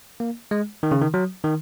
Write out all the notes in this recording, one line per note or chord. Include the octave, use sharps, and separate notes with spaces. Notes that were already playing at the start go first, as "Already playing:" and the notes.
A#3
G#3
D#3
C#3
D#3
F#3
D#3